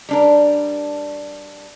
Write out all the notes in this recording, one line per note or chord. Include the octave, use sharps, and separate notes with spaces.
G3 D4 A#4